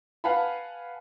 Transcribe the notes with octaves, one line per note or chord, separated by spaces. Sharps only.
B4 F5 F#5 G#5 A5 B5